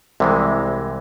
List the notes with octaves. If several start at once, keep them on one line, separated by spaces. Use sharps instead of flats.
C2 C3 E3 G#3